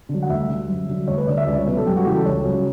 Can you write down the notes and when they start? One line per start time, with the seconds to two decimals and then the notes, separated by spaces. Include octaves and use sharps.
0.09 D3
0.14 F#3
0.22 F#5
0.29 D2 E5
0.48 D3 G3
0.68 F#2
0.88 D3 F#3
1.08 D2 C#5
1.18 B4
1.27 D3 G3 D5
1.37 E5
1.47 C#2 D5
1.57 C#5
1.66 B2 F#3 B4
1.77 A4
1.86 F#2 G4
1.97 F#4
2.06 C#3 E3 G3 G4
2.16 A4
2.26 C#2 C#5
2.45 C#3 F#3